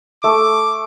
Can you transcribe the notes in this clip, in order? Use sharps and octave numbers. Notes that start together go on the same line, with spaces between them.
A3 D6